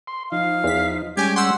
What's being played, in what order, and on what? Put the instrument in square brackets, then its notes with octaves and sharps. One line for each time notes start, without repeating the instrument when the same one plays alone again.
[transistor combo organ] C6
[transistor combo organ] F3 D#4 [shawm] F5
[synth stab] E2 B6
[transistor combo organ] G3 G#3 C#4 [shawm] G4 [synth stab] G#5 G#6
[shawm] F#5 [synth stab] C6 E6